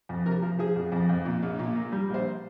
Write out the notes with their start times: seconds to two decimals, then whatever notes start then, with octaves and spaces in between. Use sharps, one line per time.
0.09 F2
0.26 C3 A#4
0.42 F3
0.59 F3 G#4
0.76 F2
0.92 F2
1.09 F2
1.25 A#2
1.43 A#1
1.59 A#2
1.76 A#3
1.92 G3
2.09 A#1 C5